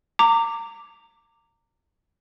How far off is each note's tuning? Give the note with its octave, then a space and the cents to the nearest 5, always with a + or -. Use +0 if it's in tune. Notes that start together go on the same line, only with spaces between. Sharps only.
A#5 -30 D6 +0